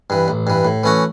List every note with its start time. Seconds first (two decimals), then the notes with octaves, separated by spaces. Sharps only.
0.10 G2 E3
0.28 A1
0.47 G2 E3
0.65 A2
0.84 E3 A3 C#4 F#4